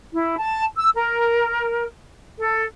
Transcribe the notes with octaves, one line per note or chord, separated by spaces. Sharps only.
E4
A5
E6
A#4
A4